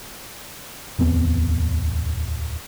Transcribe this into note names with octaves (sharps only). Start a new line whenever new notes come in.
D1 E2 B3 C4